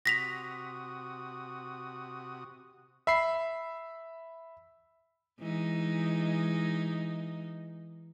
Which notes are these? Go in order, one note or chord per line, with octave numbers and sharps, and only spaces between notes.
C3 F#4 D#6 A#6 B6 F7
E5 B5 C7
E3 G#3 D#4